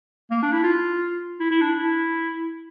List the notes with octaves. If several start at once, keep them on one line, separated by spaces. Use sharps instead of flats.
A#3
D4
E4
F4
E4
E4
D4
E4